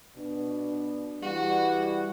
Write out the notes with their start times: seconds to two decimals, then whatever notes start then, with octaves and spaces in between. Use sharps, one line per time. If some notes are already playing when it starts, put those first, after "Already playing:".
0.15 B2 D4
1.22 E3 G3 F#4